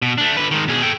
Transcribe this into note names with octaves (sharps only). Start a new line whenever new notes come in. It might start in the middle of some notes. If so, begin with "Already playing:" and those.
B2
A3 D4
D3 B4
D#3 G#3
B2 G#4
A4 G5